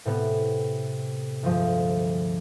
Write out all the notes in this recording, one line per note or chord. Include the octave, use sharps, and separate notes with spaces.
A2 C3 B3
D2 G2 F3 G#3